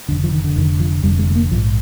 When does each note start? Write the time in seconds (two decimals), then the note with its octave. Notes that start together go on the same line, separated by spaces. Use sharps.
0.09 F1 F2 D3 D4
0.24 F3
0.33 D#3
0.44 D3
0.56 F1 F2 D3 D#3
0.80 F3
1.03 F1 F2 D3 G3
1.19 G#3
1.30 G#3
1.36 A#3
1.51 A#1 F3
1.55 G#2